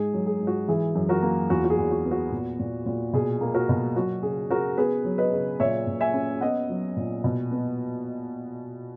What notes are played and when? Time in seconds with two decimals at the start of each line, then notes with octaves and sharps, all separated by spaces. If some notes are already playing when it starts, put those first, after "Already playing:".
Already playing: G#2 G#4
0.13 F#3
0.26 G#4
0.40 G#2
0.47 F#4
0.68 E3 G#4
0.95 F#2
1.09 F#4 A#4
1.22 A#3
1.50 E2 F#4
1.64 F#4
1.70 G#4
1.77 E2
1.91 F#4
2.05 B3
2.11 F#4
2.31 A#2
2.59 A#2
2.86 A#2
3.13 B2 G#4
3.41 A#3
3.55 F#4 A#4
3.69 B2
3.96 F#3 F#4
4.23 C#3 G#4
4.50 C#3 F#4 A#4
4.77 B3 G#4 B4
5.04 F#3
5.18 B4 D#5
5.33 C#3
5.60 A#2 C#5 E5
5.87 A#2
6.01 E5 G#5
6.14 C#4
6.41 B3 D#5 F#5
6.69 F#3
6.96 A#2
7.24 B2
7.51 B3